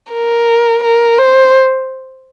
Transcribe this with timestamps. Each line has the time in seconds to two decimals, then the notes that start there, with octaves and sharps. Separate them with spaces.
0.12 A#4
0.83 A#4
1.18 C5